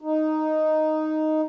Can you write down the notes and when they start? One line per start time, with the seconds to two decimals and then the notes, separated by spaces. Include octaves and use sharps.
0.01 D#4